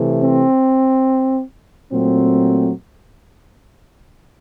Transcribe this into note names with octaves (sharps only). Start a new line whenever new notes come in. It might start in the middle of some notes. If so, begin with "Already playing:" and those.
Already playing: C3 E3 A3
C4
A#2 F#3 A3 C4